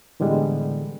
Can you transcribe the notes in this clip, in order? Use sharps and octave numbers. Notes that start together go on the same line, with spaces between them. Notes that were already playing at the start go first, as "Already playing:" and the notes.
A2 D3 E3 G3 G#3 B3